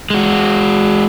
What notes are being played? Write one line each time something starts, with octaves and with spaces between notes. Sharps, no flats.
G#3 F#4